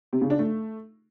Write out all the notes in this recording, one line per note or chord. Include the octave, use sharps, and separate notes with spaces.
C3
C#3
D4
A3